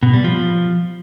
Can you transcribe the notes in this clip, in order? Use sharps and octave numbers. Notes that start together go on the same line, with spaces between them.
B2
G3
F3